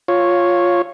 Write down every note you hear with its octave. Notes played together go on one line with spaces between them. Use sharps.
F4 C#5